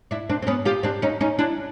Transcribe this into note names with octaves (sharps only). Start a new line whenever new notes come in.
D4 E4
C4 D4
C4
B3 C#4
F4 G4
C4 D4
C#4 D#4
C#4 D#4
D4 E4